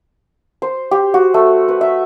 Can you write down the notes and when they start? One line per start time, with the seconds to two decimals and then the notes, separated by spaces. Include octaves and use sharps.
0.62 C5
0.91 G4
1.14 F#4
1.34 A3
1.68 B4
1.81 E5